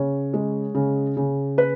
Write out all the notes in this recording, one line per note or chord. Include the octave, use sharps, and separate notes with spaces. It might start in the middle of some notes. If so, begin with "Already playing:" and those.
Already playing: C#3 C#5
G#3
C#3
C#3
B4